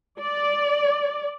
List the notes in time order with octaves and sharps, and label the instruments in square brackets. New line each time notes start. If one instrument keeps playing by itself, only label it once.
[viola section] D5